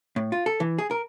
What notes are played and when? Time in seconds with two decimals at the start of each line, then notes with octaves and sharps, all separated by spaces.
0.16 A2
0.32 F4
0.46 A4
0.60 E3
0.78 G#4
0.91 A#4